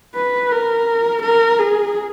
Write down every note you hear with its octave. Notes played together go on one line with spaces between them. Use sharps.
B4
A#4
A#4
G#4